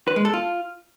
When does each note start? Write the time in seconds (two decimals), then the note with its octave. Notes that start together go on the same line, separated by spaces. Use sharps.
0.08 B4
0.16 G#3
0.25 A4
0.33 F4